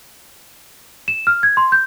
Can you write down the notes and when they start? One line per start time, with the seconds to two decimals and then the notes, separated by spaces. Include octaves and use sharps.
1.08 E7
1.27 F6
1.43 G#6
1.57 C6
1.72 G6